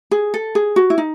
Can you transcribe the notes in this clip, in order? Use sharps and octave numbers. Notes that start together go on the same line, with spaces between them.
G#4
A4
G#4
F#4
E4
D#4